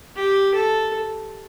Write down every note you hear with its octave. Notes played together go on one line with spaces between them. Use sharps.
G4
A4